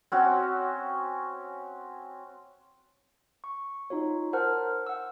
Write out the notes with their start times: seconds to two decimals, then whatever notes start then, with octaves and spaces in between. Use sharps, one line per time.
0.12 C4 C#4 F#4
3.44 C#6
3.90 D#4 F4 F#4 C#5
4.33 A#4 C5 F#5 A5 F6
4.87 F#5 E6